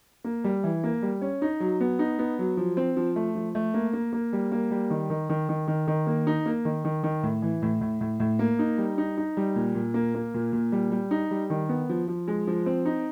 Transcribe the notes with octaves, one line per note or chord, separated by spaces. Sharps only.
A#3
G3
E3
A#3
G3
C#4
D#4
F#3
B3
D#4
B3
F#3
F3
C4
F3
A3
F3
A3
A#3
A#3
A#3
G3
A#3
G3
D#3
D#3
D#3
D#3
D#3
D#3
A#3
D#4
A#3
D#3
D#3
D#3
A2
E3
A2
A2
A2
A2
A#3
D#4
G3
D#4
D#4
G3
A#2
A#2
A#3
A#3
A#2
A#2
G3
G3
D#4
G3
D#3
B3
F3
F3
G#3
F3
C4
D#4